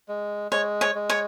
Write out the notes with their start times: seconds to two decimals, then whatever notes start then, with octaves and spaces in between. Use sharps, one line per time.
0.09 G#3
0.51 G#3 C#5
0.81 C#5
0.95 G#3
1.10 C#5